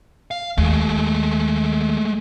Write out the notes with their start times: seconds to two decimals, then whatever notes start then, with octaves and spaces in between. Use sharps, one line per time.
0.31 F5
0.58 D#2 G#3 A3